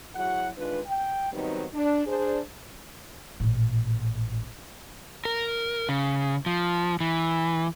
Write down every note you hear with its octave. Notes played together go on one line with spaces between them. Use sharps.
F#3 E4 F#4 G#4 F#5
D#3 G#3 D4 F4 B4
G5
D#3 F#3 G3 B3 C4 D#4
D4
D4 G#4 C5
A1 A#2
A#4
C#3
F3
E3